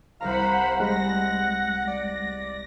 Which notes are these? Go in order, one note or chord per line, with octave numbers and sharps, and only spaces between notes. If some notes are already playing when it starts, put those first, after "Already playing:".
C2 A#4 C5 F5 F#5 A#5 B5
G3 G#3 F#5 A#6
D5